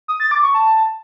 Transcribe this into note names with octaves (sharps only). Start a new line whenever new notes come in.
D#6
A6
D6
C#6
A5